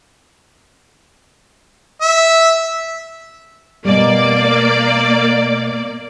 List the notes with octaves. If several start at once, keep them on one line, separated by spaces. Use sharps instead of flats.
E5
B2 G3 A#3 D5